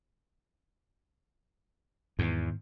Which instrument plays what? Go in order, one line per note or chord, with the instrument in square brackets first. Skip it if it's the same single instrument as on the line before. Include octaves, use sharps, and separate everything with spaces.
[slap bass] E2 [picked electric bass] G#2 D#3 B3